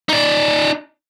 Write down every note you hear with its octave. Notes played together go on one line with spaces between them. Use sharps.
D#4 D5